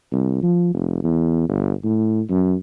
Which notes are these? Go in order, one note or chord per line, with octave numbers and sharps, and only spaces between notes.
C2
F3
F1
E2
G1
A2
F#2